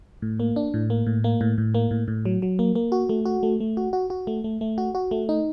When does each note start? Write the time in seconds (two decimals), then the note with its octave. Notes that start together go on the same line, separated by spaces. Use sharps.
0.22 A2
0.40 A#3
0.56 D4
0.74 A2
0.90 A#3
1.07 A2
1.24 A#3
1.41 A2
1.58 A2
1.75 A#3
1.91 A2
2.08 A2
2.25 F#3
2.42 F#3
2.59 A#3
2.75 A#3
2.92 F#4
3.09 A3
3.26 F#4
3.43 A3
3.60 A3
3.77 F#4
3.93 F#4
4.10 F#4
4.27 A3
4.44 A3
4.61 A3
4.78 F#4
4.95 F#4
5.11 A3
5.29 D#4